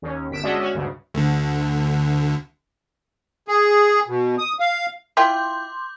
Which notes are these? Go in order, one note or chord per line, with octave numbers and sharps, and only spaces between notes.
D#2 C#4
G1 B6 D7 E7
G#3 C#4 D4 F#4 D#5 E5
C#4 F#4
D2 G2 C#3
D2 D3
G#4
B2
D#6
F5
E4 F4 G5 C6 D6 G6